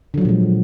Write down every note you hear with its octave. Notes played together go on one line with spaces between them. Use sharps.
A#2 D3 F3 F#3 G#3